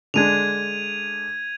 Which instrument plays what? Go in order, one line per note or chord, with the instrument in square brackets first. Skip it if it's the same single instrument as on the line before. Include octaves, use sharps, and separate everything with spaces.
[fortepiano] D3 G#3 D4 [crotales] G#6 D#7 F7